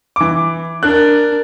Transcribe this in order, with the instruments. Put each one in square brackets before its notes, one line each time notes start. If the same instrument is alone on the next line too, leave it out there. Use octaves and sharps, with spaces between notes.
[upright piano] E3 D6
[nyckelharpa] D4 A#4 [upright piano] F#6